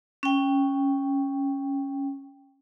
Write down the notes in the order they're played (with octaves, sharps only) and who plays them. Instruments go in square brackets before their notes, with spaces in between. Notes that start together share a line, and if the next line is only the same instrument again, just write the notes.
[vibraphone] C#4 G5